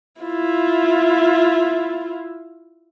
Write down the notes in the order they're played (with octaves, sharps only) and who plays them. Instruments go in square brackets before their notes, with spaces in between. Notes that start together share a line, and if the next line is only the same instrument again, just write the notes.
[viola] E4 F4